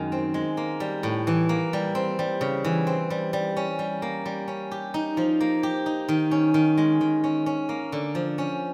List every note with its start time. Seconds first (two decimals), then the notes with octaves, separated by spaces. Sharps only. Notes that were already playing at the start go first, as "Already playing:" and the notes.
Already playing: F#2 D#3 G#3
0.12 C4
0.34 G#3
0.57 A#3
0.80 G3
1.03 A2
1.27 E3
1.49 A#3
1.73 G3
1.95 C4
2.19 G3
2.41 C#3
2.65 E3
2.87 C4
3.10 G3
3.33 G3
3.57 C#4
3.79 G3
4.02 A#3
4.25 G3
4.48 C#4
4.71 G4
4.94 D#4
5.17 F3
5.41 A#3
5.63 G4
5.86 D#4
6.09 D#3
6.31 C#4
6.54 D#3
6.78 G#3
7.01 D#3
7.24 C#4
7.46 C#4
7.69 A#3
7.92 D3
8.15 F3
8.38 C#4